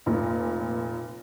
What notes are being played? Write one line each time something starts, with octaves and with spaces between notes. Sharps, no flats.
F1 A#2